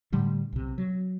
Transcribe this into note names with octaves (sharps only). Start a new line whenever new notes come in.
A2 D3 G3 A3
B1 C3
F#3